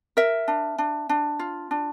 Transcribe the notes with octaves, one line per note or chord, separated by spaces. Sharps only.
A#4 E5
D4
D4
D4
F4
D4